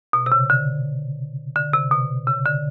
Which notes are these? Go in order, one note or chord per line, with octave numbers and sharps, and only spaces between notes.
B2
C3
C#3
D3
D3
C3
B2
C#3
D3